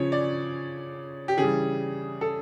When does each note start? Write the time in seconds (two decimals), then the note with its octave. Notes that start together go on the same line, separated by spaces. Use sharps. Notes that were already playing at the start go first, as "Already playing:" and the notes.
Already playing: C#3 F3 C#5
0.12 D5
1.28 G4
1.38 C#3 E3 G3 G#4
2.21 A4